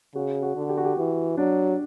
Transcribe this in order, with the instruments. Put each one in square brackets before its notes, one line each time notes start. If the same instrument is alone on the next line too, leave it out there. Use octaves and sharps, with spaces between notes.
[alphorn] C#3 [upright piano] F#4
[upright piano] F#4
[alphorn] D3
[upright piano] G4
F#4
G4
[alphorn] E3 [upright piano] F#4
[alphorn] F#3 [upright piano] D4